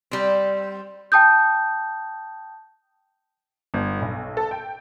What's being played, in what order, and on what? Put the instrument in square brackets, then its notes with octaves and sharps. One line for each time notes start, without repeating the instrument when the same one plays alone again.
[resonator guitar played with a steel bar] G3 C4
[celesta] G5 A5 D#6 G6
[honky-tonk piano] G1
B1
A4
G5